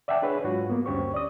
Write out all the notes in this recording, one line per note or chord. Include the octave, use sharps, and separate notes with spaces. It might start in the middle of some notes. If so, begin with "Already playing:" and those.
D5 E5 F#5 G5 A5
D4 G#4 B4 C#5
G#2 F#3 F4 F#4
A#3 B3
D2 G2 C#4 G4 C5 C#6
D5 D#6